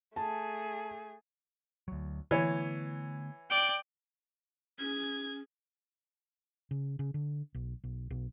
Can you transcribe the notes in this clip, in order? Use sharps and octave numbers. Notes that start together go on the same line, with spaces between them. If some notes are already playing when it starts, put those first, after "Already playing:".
A3 G#4 A5
D2 F#3
D3 E3 A3 B3 C#5
D5 G5
C#4 G#4 G#6
C#3
C#3
D3
B1
B1
B1